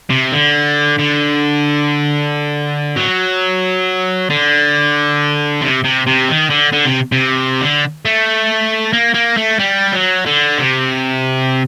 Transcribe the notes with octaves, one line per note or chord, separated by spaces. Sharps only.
C3
D3
D3
F#3
D3
C3
C3
C3
D#3
D3
D3
C3
C3
D3
A3
A#3
A#3
A3
G3
F#3
D3
C3